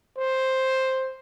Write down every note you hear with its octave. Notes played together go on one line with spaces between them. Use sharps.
C5